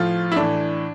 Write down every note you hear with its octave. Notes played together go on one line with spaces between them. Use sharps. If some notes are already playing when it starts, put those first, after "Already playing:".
Already playing: A2 F3 F4
E4
A2 E3 D4